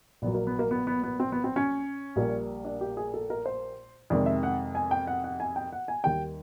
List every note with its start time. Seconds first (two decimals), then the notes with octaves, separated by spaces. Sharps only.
0.22 A#1 A#2 F#3 B3
0.35 A#3
0.47 B3
0.59 A#3
0.71 B3
0.87 B3
1.03 B3
1.20 C4
1.32 B3
1.44 C4
1.56 C#4
2.16 A#1 A#2 G3 A#3
2.65 D4
2.81 G4
2.97 G#4
3.14 A4
3.30 A#4
3.46 C5
4.10 F2 C3 D#3 G#3 D5
4.26 E5
4.43 F#5
4.75 G#5
4.91 G5
5.07 F#5
5.24 F#5
5.40 G#5
5.56 G5
5.72 F#5
5.88 G#5
6.04 D#2 D#3 G3 A#3 G5